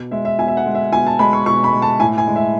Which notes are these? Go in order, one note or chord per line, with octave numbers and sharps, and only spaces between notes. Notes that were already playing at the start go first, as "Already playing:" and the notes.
Already playing: B2
G#3 E5
E5
B2 G#5
E5
F#5
G#3
E5
B2 G#5
A5
G#3 B5
C#6
B2 C#6
B5
G#3
A5
A2 G#5
G#5
G#3
E5